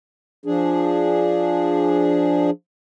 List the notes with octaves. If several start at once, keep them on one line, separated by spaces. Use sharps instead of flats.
F3 D4 G#4